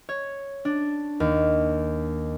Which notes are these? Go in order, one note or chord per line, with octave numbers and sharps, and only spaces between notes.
C#5
D4
D#2